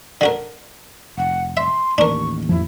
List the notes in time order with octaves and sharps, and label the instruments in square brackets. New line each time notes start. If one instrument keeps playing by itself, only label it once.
[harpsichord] D3 F#4 A#4
[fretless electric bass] F1 [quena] F#5
[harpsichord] E5 [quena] C6
[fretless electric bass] A1 D#2 [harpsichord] D4 A#4 [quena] C#6
[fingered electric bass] F2 F3 [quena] E4